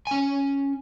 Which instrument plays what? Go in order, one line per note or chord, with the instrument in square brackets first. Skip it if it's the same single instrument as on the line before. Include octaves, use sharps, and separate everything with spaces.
[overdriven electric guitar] C#4 G#5